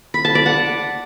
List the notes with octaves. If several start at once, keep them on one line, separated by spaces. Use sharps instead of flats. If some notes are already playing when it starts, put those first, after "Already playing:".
B5
A5
D5
F#5